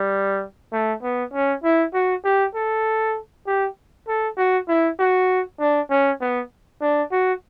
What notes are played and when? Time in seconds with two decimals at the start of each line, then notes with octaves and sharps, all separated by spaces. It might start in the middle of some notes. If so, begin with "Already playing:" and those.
Already playing: G3
0.72 A3
1.03 B3
1.33 C#4
1.64 E4
1.94 F#4
2.24 G4
2.55 A4
3.47 G4
4.07 A4
4.37 F#4
4.68 E4
4.99 F#4
5.60 D4
5.90 C#4
6.20 B3
6.81 D4
7.12 F#4